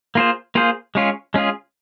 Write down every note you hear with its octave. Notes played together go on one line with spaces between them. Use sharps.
A#3 F4 G#4 C5
A#3 F4 G#4 C5
G#3 C#4 F4 G#4
G#3 C#4 F4 G#4